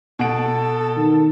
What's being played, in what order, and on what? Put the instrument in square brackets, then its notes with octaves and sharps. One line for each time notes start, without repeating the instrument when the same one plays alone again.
[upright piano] B2 F#5 D7 [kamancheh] A4
[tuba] D#3